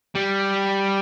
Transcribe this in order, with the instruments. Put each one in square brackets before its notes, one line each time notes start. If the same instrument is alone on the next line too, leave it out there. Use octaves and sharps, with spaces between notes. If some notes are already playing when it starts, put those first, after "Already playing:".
[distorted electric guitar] G3